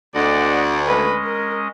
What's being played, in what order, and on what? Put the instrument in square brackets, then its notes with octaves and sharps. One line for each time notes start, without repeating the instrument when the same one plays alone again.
[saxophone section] D2 [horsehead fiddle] D5 [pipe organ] D#5 F#5
[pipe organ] G#3 C#4 D#5 [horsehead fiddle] B4
[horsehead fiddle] A#4